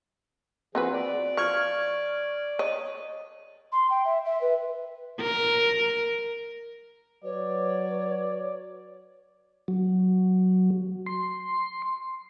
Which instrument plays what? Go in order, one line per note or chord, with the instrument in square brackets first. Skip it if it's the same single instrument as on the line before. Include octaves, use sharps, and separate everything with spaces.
[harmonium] F3 G#4 [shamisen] C4 F#4 B4
[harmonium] D5
[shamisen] F3 [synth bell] C#6 F6 G#6
[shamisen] C#5 [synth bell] D#5
[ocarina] C6
G5
E5
E5
B4
[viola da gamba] A#4
[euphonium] F#3 [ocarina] B4 [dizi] C#5 [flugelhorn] D5
[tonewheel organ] F#3
C6